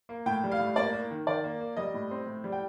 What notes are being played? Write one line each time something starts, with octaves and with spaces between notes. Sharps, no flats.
A#3
A2 G5
G3
F5
A2
A#3 D5
A#3
D#3
D#3 D5
A#3
A#3
G3 D#5
A2
C4
A2
G3
G5